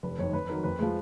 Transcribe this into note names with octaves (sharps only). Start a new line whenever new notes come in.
F1 B4
F2 D#3 C#5
F2 B4
D#3 F#3 A#4
F2 B4
F3 G#3